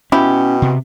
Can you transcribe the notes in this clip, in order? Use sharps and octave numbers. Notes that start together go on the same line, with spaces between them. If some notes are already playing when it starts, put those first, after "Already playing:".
B2 C#4 E4 G4
C3